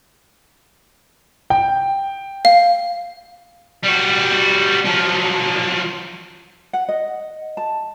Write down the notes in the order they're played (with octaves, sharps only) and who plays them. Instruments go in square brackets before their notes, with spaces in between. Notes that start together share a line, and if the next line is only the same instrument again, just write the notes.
[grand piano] G5
[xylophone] F5
[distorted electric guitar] G3 F#4
F3 F#3
[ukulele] F#5
D#5
A5